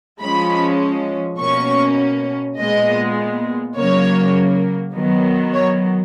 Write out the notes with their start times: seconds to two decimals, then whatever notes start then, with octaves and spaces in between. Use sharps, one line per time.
0.21 F3 G#3 C#4 B5
1.39 B2 A#3 C#4 C#6
2.58 A#2 G#3 B3 D#5
3.76 C#3 F#3 A#3 C#5
4.95 D#3 F#3 B3
5.54 C#5